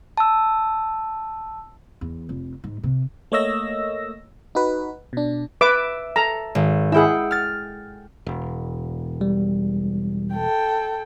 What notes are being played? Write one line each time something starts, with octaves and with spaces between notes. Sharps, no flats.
A5 E6
E2
F1
G#2
C3
A3 A#3 C#5 D#5 E6 A#6
D#4 F#4 B4
B2 D4
B4 E5 D6 D7
A4 A#5
G#1
E4 G#4 F#5 G5 E6
F6 A6
E1
G3
A4 G5